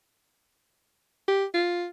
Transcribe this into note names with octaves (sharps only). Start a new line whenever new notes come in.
G4
F4